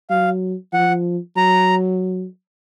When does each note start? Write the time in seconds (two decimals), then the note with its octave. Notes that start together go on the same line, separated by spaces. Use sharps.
0.10 F#3 F5
0.73 F3 F#5
1.36 F#3 A#5